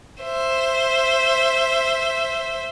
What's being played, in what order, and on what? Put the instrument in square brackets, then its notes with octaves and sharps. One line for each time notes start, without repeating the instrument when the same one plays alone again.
[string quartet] C5 E5